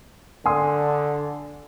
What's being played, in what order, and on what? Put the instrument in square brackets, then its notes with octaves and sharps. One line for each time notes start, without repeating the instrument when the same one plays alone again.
[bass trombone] D3 [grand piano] G#5 C6 D#6